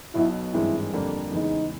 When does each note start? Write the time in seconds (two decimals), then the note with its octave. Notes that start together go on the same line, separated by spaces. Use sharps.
0.14 B1 B2 F#3 E4
0.54 G#1 G2 E3 G#3 C4 E4
0.93 F2 D3 G3 A#3 D4
1.32 E2 C#3 E3 G#3 D#4